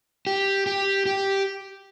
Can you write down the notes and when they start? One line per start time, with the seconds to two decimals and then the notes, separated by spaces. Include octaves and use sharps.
0.27 G4
0.67 G4
1.06 G4